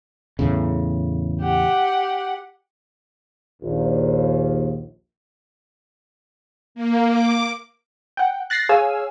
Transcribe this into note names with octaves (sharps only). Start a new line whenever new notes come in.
E2 A2 C#3
G4 F#5
A#1 D#2
A#3
D6
F#5 G5
F#6 A6 A#6 C7
G#4 C#5 F5 G#5 E6